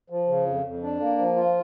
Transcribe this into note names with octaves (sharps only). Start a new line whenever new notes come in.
F3
C#3
F2
F2
D4
A#3
F3
F4